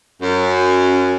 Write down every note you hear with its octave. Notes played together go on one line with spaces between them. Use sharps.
F#2